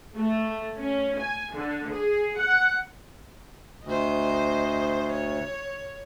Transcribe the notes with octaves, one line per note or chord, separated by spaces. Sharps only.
A3
C#4
G#5
D3
G#4
F#5
D2 C5 D#5
C#5